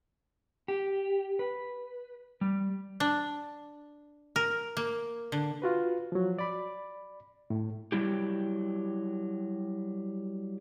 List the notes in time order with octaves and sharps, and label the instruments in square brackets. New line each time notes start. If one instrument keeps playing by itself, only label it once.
[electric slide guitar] G4
B4
G3
[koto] D4
A#4
A#3
D3
[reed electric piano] F4 F#4 B4
F3 F#3
D5 B5
A2
[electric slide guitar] F#3 G3 E4 G4